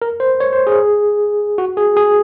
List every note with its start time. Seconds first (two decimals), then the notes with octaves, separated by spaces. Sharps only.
0.02 A#4
0.20 C5
0.40 C#5
0.53 C5
0.67 G#4
1.58 F#4
1.77 G#4
1.96 G#4